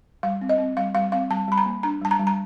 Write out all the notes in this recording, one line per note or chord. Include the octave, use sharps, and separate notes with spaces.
G3 F5
C4
D#5
C4
G3 F5
G3 F5
C4 F5
G3 A5
G3 B5
A#5
A#3
D4 A#5
G3 A5
A#5
G3
A#5